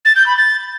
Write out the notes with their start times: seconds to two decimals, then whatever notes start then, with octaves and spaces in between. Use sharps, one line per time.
0.05 A6
0.15 G6
0.26 B5
0.36 A6